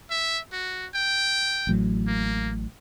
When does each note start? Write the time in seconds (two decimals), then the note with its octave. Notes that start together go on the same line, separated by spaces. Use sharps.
0.10 E5
0.52 F#4
0.95 G5
1.67 A1 A2 F#3
2.07 A#3